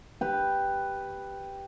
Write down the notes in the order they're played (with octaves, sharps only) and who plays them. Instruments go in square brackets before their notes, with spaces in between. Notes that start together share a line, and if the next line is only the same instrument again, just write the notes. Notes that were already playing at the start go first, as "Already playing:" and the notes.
[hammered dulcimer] G4 B4